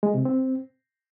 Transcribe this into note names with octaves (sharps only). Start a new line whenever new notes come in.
G#3
C3
C4